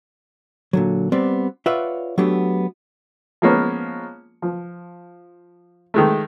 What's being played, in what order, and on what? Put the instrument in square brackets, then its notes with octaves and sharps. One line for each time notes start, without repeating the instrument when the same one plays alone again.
[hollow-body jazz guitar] A#2 D3 F#3
G3 B3 C4 D5
F4 B4 C#5 D5 E5 F#5
F#3 A3 B3 D4 G4
[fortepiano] F3 G#3 A#3 B3 C#4
F3
D#3 G#3 A3